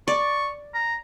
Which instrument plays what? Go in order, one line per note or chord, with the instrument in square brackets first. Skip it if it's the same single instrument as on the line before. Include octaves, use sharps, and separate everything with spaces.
[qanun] D5 [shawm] C#6
[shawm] A#5